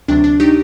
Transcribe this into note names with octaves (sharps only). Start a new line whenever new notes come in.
D2 C3 F#3 D4
D4
F#3 D#4 G4